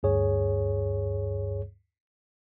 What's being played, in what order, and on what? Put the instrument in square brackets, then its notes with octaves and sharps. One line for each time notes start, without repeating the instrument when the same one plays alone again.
[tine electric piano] D2 G2 G#4 C#5